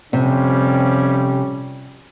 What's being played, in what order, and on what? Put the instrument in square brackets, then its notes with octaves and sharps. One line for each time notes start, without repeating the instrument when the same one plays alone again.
[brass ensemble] F2 G3 C#4 [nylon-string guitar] C3